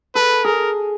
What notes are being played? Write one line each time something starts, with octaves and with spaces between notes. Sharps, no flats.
A4 B4
G#4 A#4